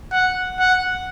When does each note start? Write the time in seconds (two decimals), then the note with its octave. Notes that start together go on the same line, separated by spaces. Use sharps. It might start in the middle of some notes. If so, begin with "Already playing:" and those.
0.12 F#5
0.60 F#5